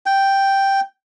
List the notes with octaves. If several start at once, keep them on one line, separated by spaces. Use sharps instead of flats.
G5